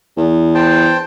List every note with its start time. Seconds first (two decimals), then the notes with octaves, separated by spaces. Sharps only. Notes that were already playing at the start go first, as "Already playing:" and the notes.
0.17 E2
0.55 C5 G5 A5